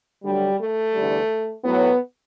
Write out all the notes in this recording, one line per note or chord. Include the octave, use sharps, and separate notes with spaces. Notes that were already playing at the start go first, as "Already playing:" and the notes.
D2 D3 F#3 G3
A3
E2 D3 G3
A2 F#3 B3